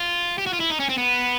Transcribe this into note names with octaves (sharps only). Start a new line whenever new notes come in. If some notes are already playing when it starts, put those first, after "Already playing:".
Already playing: F4
G4
F#4
F4
E4
D#4
C#4
C4
B3